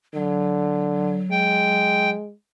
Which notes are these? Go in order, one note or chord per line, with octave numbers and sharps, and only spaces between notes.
D3 F#3
G#3 G5